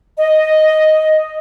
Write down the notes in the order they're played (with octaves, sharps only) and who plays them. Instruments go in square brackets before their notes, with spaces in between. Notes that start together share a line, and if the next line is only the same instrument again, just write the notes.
[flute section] D#5